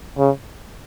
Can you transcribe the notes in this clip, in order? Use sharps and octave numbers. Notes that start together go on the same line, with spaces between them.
C#3